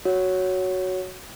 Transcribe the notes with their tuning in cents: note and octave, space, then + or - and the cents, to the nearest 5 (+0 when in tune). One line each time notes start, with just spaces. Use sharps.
F#4 +0 C#5 +5